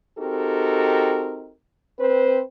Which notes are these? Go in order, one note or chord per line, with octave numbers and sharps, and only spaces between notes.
C4 D#4 F#4 G4 A4 A#4
C4 B4 C5